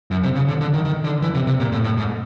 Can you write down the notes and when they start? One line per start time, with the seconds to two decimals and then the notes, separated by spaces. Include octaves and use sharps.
0.11 F#2
0.23 C3
0.35 C#3
0.48 D3
0.61 D3
0.74 D#3
0.85 D#3
1.04 D3
1.22 E3
1.35 C3
1.47 C3
1.60 A#2
1.72 A2
1.84 A2
1.97 G#2